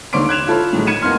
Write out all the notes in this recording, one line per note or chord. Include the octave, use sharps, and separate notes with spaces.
D#2 D3 C#5 C6 D6 D7
F#6 G#6 E7 F7
E4 F4 A4 C#5 B5
A2 D#3 E3 F#3 G#3
G#6 C#7 D#7 E7
E2 A#3 D#4 C6 F6